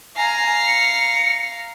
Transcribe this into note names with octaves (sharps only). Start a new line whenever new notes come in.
F5 G#5 A#5
C#7